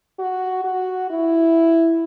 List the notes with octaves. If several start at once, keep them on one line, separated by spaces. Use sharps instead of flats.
F#4
F#4
E4